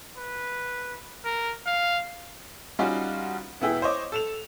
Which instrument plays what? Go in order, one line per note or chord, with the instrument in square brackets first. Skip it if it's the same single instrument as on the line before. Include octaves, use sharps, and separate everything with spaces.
[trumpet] B4
A#4
F5
[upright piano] G3 C#4 D#4 F4 F#4
E1 B3 E4 G#4 G5
C5 C#5 D#5 D6
A4 E7 F7